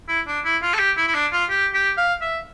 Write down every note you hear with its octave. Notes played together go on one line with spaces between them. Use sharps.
E4
D4
E4
F4
A4
G4
E4
E4
D4
F4
G4
G4
F5
E5